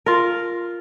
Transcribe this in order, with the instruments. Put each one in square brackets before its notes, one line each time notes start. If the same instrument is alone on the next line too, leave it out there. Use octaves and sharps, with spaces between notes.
[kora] F4 A#4